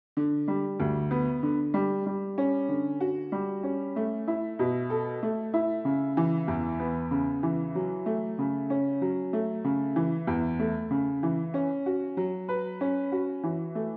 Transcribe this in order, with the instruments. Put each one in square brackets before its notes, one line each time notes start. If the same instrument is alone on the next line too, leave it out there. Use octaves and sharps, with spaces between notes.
[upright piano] D3
G3
D2
B3
D3
G3
G3
C#4
D3
F#4
G3
C#4
A3
E4
B2
A4
A3
E4
C#3
E3
E2
B3
C#3
E3
F#3
A3
C#3
C#4
F#3
A3
C#3
E3
E2
A3
C#3
E3
C#4
F#4
F#3
B4
C#4
F#4
E3
A3